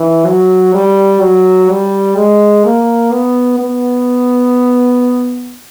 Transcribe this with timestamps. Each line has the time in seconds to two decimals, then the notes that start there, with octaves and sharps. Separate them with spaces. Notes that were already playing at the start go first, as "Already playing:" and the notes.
Already playing: E3
0.27 F#3
0.74 G3
1.22 F#3
1.70 G3
2.16 G#3
2.65 A#3
3.12 B3
3.59 B3